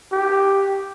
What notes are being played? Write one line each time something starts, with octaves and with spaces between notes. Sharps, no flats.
G4